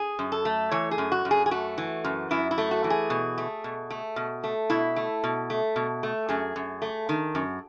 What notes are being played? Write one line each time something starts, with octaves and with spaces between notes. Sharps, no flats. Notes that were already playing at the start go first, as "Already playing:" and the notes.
Already playing: G#4
F#2
A4
A3
E3 C#5
G#4
F#2
F#4
F#2
G#4
G#4
A3 F#4
E3
F#2
F#2 E4
E4
A3
F#4
E3
G#4
B2
A3
B2
A3
B2
A3
B2 E4
A3
B2
A3
B2
A3
F#2 G#4
F#2
A3
D#3
F#2